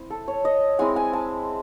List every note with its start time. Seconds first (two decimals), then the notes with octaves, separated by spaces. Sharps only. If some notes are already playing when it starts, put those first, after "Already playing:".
Already playing: C4 E4
0.10 A4
0.28 C#5
0.45 D#5
0.79 G#3 C4 E4 G#5
0.96 G#5
1.13 A5